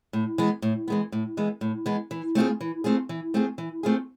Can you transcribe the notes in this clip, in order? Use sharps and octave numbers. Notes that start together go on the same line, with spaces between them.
A2
E3 G#3 B3
A2
E3 G#3 B3
A2
E3 G#3 B3
A2
E3 G#3 B3
E3
A3 C4 F4 G#4
E3
A3 C4 F4 G#4
E3
A3 C4 F4 G#4
E3
A3 C4 F4 G#4